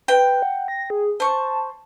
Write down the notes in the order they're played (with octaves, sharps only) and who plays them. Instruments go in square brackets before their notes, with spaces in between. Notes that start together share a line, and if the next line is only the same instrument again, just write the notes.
[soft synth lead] B4 [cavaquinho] G5
[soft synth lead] F#5
A#6
G#4
[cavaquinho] C5 C#6 [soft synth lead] A5